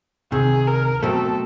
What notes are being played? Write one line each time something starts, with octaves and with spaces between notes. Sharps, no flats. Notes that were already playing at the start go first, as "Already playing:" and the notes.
C#2 C3 D#3 G#4
A#4
B2 F#3 A3 C4 A4